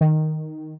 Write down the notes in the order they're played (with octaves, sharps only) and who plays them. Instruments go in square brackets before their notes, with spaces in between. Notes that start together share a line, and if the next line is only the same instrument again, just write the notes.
[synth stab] D#3